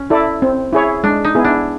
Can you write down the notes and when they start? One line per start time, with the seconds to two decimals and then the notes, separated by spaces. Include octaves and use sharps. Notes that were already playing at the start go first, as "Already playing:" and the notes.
Already playing: C#4
0.10 E4 A4 D5
0.42 C4
0.73 E4 G#4 C#5
1.04 G#3 D4
1.25 D#4
1.35 B3 E4 G#4
1.44 D4